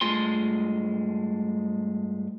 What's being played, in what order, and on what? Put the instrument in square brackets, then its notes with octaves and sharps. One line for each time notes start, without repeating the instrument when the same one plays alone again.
[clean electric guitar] G2 G#3 A3 F4 G#5 C6